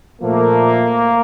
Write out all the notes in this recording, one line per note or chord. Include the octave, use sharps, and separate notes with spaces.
A#2 F3 A3 A#3